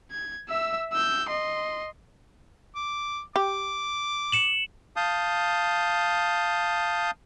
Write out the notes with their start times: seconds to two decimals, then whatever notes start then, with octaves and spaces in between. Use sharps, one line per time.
0.11 G#6
0.49 E5 E6
0.93 E6 G6
1.29 D#5 C6
2.75 D6
3.36 G4 D6
4.32 C#7 E7 F#7
4.96 F5 A5 D#6 G6